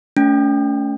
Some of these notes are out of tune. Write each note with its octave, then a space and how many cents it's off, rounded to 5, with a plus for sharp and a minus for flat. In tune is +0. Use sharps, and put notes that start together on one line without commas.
A3 +0 C#4 +35 G5 +0